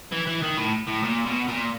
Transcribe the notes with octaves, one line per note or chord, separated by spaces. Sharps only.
E3
E3
D#3
A2
A2
A#2
B2
A#2